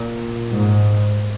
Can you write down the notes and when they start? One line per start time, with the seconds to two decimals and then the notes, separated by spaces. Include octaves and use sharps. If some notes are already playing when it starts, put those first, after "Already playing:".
Already playing: A#2
0.52 G#2